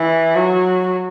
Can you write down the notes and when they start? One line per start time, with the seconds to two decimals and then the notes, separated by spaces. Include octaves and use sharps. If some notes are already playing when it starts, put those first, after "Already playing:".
Already playing: E3
0.36 F#3